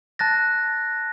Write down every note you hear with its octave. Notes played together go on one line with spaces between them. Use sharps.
A5 F#6 A6 A#6